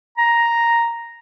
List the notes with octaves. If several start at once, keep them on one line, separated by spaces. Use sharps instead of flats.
A#5